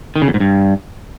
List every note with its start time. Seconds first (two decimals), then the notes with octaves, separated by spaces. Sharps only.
0.16 D#3
0.22 C#3
0.28 E2
0.34 G#2
0.40 G2